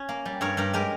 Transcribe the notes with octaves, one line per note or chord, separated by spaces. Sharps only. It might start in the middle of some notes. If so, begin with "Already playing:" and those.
Already playing: C#4
A#3
G3
G2 A#4 C#5
G2 G4 A#4
G#3 G4 A#4